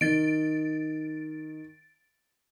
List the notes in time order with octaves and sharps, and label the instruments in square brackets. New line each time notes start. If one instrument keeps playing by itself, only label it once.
[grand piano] D#3 [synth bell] A6 D7